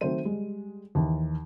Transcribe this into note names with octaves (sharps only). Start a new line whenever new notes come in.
D#3 F#3 A3 C4 C5 D#7
G3 G#3
D#2 E3